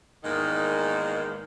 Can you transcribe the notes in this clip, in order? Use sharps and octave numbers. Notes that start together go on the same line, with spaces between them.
E2 G#2 D#3 A#3 D#5